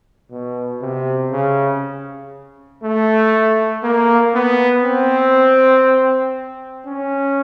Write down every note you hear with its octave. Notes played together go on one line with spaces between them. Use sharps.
B2
C3
C#3
A3
A#3
B3
C4
C#4